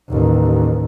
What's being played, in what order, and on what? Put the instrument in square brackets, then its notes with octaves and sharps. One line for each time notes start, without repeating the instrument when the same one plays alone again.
[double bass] A1 D#2